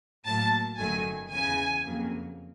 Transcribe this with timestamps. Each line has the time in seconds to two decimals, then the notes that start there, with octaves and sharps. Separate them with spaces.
0.25 A2 F#3 A#3 A5
0.77 G1 F#2 D#3 F#3 A3 G#5
1.31 E2 C#3 E3 G#5
1.84 F2 C#3 F#3 A#3